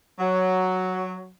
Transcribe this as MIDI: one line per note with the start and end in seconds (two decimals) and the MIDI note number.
0.19 1.30 54